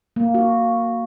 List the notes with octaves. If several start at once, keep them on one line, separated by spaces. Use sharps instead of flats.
A#3
F#4